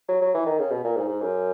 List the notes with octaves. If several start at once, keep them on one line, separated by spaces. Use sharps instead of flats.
F#3
F#3
E3
D#3
C#3
B2
A#2
G#2
G#2
F#2